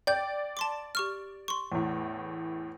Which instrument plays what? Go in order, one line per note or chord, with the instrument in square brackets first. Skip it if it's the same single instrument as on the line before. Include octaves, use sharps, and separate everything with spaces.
[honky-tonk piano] D5 [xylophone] G5 G6
[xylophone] A5 C6 D6
G4 C#6 F6
C6 C#6
[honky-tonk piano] E2 A2